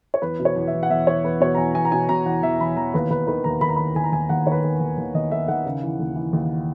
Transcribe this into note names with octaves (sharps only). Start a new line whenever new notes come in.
C#5
E2 B4
B2
C#5
E2
E5
E2
F#5
E2 E5
E2 C#5
E2 B4
B2 C#5
A#5
E2 G#5
E2 G#5
A#5
B2 G#5
B2 A#5
E2 F#5
E2 E5
E2 B5
E2 A#5
D#2 B4
D#2 B4
D#3 B4
D#2 A#5
D#3 B5
A#5
D#2 B5
D#3 G#5
A#5
D#2 G#5
D#2 F#5
D#3 C#5
B4
D#3
D#2
D#2
D#2 D#5
D#3 E5
D#3 F#5
C#3
E3
D#2
E3
D#2